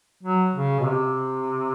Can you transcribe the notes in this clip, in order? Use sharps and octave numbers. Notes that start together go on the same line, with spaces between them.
F#3
C#3
B2
C3